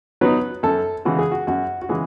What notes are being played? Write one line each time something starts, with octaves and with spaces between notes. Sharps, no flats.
F#3 B3 D#4 B4
F#2 A4
C#3 E3 G#3 F#4
G#4
F#4
F#2 F#4
F#4
C#3 E3 G#3 G#4